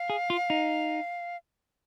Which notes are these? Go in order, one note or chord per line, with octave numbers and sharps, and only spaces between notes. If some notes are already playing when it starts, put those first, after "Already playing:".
Already playing: F5
G#4
F4
D#4